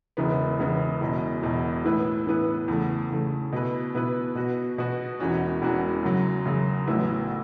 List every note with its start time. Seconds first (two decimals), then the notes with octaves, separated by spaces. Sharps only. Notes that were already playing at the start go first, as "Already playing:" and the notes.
0.17 E1 E2 C#3 E3 B3
0.59 E1 E2 C#3 E3 B3
1.01 E1 E2 B2
1.42 E1 E2 B2
1.85 A2 E3 B3 E4 B4
2.27 A2 E3 B3 E4 B4
2.68 E2 C#3 A3
3.10 E2 C#3 A3
3.52 B2 B3 E4 B4
3.94 B2 B3 E4 B4
4.35 B2 B3 F#4
4.78 B2 B3 F#4
5.20 E1 E2 E3 C#4 F#4
5.61 E1 E2 E3 C#4 F#4
6.03 F#2 C#3 F#3
6.45 F#2 C#3 F#3
6.87 A1 A2 F#3 B3 E4